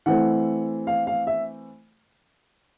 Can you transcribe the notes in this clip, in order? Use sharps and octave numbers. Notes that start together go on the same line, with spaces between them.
E3 A3 C4 F#5
F5
F5
E5